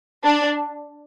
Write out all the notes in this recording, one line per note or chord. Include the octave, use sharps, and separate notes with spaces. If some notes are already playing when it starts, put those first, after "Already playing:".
D4